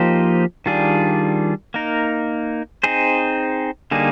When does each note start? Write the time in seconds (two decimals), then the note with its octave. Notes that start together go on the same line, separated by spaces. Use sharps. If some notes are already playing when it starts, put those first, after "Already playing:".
Already playing: F3 A#3 D#4 G4 C5
0.66 D#3 G3 D4 F4 G#4
1.74 A#3 D#4 A#4
2.83 C4 D#4 G#4 C5
3.91 D3 G3 A#3 D#4 G#4